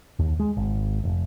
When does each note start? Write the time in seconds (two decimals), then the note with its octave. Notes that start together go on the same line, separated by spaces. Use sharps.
0.19 D#2
0.40 G#3
0.57 G#1
1.03 F1